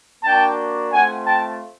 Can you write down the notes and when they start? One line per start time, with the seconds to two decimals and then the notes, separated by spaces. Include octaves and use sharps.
0.24 A#3 D4 F#4 G5 A5
0.92 A3 C4 F4 F#5 G#5
1.26 G5 A5